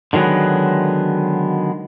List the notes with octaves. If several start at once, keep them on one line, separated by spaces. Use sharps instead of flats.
D3 D#3 F#3 G#3 B3